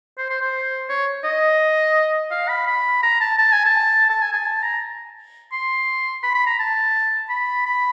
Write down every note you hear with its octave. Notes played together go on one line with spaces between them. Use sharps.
C5
C5
C5
C#5
D#5
F5
B5
B5
A#5
A5
A5
G#5
A5
A5
G#5
G#5
A5
A#5
C6
B5
B5
A#5
A5
B5
B5